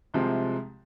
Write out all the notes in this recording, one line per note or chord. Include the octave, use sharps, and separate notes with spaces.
C2 C3 F3 G#3 C4